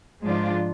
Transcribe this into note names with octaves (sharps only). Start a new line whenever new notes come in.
G#2 F3 G#3 D4 F4